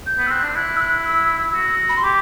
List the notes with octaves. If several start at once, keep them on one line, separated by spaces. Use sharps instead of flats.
G6
B3
E6
C4 F#6
D4
E4 F#6
E6
F#6
E6
F#4
B5
C6
G4 D6